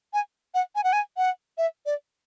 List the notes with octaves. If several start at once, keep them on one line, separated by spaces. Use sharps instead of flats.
G#5
F#5
G#5
F#5
G#5
F#5
E5
D5